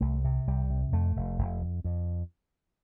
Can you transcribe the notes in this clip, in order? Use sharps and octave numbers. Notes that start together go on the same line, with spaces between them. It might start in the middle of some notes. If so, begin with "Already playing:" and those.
C2 A3
C3
C2 G3
C3
F2 A3
F1
F1
F2
F2